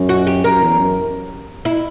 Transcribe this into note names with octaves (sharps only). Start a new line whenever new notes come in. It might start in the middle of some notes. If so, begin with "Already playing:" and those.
Already playing: F#2
F#4
G4
F#2 A#4
E2
F#2
E4